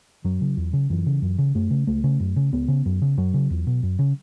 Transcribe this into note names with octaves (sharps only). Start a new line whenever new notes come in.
F#2 F#3
C#3
E2
C#3
F#2 E3
C#3
F#2
C#3
F#2 A3
C#3
C#2 A3
C#3
F#2
C#3
C#2 B3
C#3
F#2
C#3
F#2 F#3
C#3
E2
B2
F#2
C#3